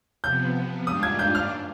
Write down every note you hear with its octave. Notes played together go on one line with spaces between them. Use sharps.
C3 F3 B3 G6
G#2 G3 D4 F4 D#6
G#6
G6
F6